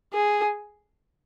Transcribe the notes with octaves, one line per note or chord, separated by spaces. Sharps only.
G#4